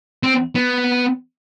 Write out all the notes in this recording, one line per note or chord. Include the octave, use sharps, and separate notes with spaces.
C4
B3